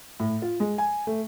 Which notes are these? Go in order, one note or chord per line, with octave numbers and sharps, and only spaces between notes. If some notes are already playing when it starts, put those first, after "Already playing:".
A2
F4
G#3
G#5
A3